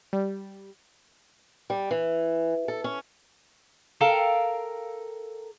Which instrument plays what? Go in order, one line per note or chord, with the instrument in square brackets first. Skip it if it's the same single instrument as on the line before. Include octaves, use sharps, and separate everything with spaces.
[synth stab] G3
[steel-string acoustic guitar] G3
E3
A4
C#4
[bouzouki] A4 A#4 F5 G5